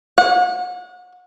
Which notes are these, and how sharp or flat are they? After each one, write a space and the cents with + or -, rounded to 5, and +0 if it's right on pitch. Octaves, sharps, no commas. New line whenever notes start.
F#5 -35